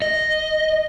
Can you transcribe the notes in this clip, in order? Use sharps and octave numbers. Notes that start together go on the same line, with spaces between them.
D#5